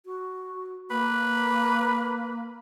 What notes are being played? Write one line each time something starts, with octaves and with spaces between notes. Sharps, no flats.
F#4
A#3 B4